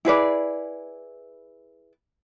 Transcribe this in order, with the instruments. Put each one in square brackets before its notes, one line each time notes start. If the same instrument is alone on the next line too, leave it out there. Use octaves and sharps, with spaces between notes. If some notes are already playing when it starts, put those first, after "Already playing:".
[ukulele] E4 G#4 B4 D5